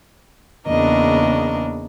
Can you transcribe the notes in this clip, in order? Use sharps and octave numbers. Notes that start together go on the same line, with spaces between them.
E2 C#3 A#3 D4 A#4 D#5